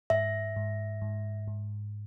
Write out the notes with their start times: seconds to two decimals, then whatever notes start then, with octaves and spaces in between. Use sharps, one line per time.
0.10 G#2 E5
0.56 G#2
1.02 G#2
1.48 G#2